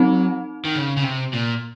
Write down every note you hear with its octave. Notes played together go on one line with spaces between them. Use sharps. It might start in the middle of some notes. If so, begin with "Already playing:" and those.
Already playing: F#3 C4 D#4
D#3
C#3
C#3
C3
A#2